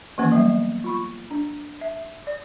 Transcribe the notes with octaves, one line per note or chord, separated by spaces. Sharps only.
D#3 E3 A#3 C#4
F#3 G3 B3 E5
F4 B5 C#6
D4
E5
D5